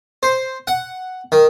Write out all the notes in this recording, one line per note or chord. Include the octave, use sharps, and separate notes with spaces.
C5
F#5
D#3